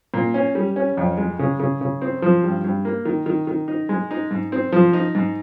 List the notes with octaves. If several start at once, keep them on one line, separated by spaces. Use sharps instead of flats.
A#2
C#4
G3
C#4
F2
G#3
C#3
C#3
C#3
C4
F3
G2
G2
A#3
D#3
D#3
D#3
D#4
G#3
D#4
G#2
C4
F3
D#4
G#2